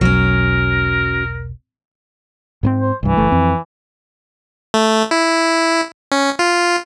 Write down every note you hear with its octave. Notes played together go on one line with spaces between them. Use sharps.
E1 B1 F#3 C#4 A#4
G#2 B3 C4
C5
C2 G2 E3
F#1 A3
F2 C4
A3
E4
C#4
F4